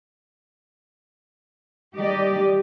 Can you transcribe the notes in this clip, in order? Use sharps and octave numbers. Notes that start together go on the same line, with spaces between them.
D#3 G3 G4 D5 D#5